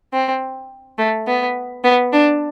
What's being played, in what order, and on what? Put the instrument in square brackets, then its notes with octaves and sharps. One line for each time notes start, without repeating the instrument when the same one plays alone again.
[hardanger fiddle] C4
A3
B3
B3
D4